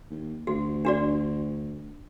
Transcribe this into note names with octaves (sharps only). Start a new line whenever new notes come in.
D#2
D2 F#4
D4 F#4 D5